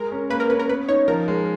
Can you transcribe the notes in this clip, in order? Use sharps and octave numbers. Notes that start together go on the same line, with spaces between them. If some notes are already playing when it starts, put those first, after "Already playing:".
Already playing: G#3 A#4
C#4
A#3 B4
A#4
C#4 B4
A#4
B3 B4
D#4 C#5
F3 A#4
G#3